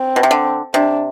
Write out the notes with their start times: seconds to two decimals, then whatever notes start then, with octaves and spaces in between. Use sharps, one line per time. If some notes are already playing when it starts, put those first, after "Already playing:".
Already playing: C4
0.16 B2
0.23 C3
0.31 D3
0.74 C3 D4